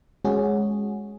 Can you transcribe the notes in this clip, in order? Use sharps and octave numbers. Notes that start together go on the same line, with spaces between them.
G#3 C#4 F#4 G#4